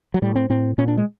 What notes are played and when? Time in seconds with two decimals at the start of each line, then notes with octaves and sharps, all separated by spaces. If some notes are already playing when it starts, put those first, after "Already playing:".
0.14 F#3
0.22 A2 G3
0.35 C4
0.50 A2 C4
0.78 A#2 C#4
0.88 D4
0.97 G#3